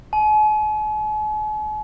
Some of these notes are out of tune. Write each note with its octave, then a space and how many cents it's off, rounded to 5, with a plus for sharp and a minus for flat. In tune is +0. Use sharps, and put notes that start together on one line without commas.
G#5 +45